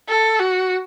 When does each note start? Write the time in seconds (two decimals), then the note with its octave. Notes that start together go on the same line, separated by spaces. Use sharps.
0.09 A4
0.39 F#4